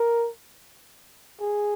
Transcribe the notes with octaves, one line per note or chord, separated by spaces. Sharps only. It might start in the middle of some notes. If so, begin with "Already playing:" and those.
Already playing: A#4
G#4